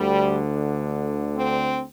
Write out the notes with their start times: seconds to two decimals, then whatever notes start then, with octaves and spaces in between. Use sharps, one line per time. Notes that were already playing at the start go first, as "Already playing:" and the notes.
Already playing: D2 D3 G3
1.35 C4